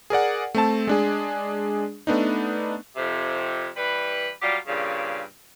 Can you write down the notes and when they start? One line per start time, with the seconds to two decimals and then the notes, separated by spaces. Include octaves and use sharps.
0.10 G#4 A#4 D5 F#5
0.55 A3 C4 A5
0.87 G#3 D4 G#4
2.07 A3 B3 D4 D#4
2.96 F2 C3
3.77 E3 G3 B4
4.41 F#3 G3 F4 G4
4.67 G2 A#2 C#3